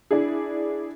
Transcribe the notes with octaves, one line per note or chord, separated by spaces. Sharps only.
D4 E4 G#4